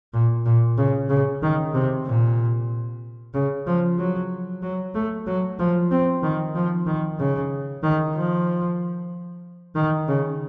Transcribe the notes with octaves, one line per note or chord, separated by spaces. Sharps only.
A#2
A#2
C#3
C#3
D#3
C3
A#2
C#3
F3
F#3
F#3
A3
F#3
F3
C4
D#3
F3
D#3
C#3
D#3
F3
D#3
C#3